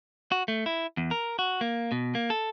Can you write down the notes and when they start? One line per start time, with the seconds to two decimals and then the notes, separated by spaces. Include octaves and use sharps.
0.32 F#4
0.48 A3
0.66 E4
0.97 E2
1.11 A#4
1.39 F#4
1.61 A#3
1.92 B2
2.15 A#3
2.30 A4